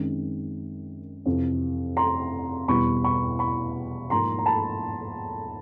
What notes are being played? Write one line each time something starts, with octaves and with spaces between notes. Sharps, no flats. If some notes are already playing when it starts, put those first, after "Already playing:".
Already playing: F#2 D#3 G#3 C4
F2 C3 E3
A#5 C6
E2 B2 G3 B5 C#6
B5 C#6
B5 C#6
G#2 F3 A#3 A#5 C6
A#5
A5 B5